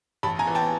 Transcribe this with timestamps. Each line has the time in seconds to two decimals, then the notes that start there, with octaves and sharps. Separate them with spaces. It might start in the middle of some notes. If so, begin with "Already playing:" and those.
0.23 A1 A5 B5
0.39 G#5 A#5
0.47 E3
0.55 G5 A5